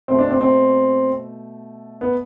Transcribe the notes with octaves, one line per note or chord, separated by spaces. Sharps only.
B2 A3 C4
D4
C4
C4
B3